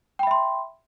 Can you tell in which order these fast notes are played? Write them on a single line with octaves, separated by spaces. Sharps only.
G5 B5 E5 C6